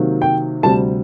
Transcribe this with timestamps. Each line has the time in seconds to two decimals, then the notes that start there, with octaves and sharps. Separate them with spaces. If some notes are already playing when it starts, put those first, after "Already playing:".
Already playing: C3 D#3 F#3 A#3
0.22 G5
0.63 D2 C3 G3 A5